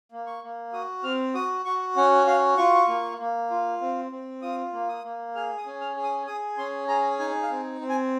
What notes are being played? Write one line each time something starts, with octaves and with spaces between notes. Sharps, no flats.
A#3
C#6
A#3
F#4 D#6
C4 F6
F#4 D#6
F#4 C#6
C#4 F#5
F#4 F5
F4 C#6
A#3
A#3
F4
C4
C4
F4 D#6
A#3
D#6
A#3
G#4 F6
D#6
C#4
F6
G#4
D#6
G#4 D#6
C#4 C6
G#4 A#5
D#4 G#5
F5
C4
C4
G#5